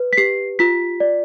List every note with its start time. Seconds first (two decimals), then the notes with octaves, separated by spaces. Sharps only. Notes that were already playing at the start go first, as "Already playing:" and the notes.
Already playing: B4
0.13 B6
0.17 G4 C7
0.59 F4 B6
1.00 D5